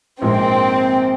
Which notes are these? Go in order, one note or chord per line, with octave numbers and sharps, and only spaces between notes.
A#1 G#2 F3 A#3 C4